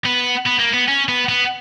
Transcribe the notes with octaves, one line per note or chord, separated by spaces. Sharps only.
B3
B3
A#3
B3
C#4
B3
B3